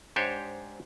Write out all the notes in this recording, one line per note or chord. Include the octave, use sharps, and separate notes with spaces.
G#2 D4 G4 C5 C#5